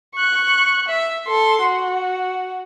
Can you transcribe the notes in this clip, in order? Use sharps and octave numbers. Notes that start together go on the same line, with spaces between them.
C#6 F#6
E5
A4 C6
F#4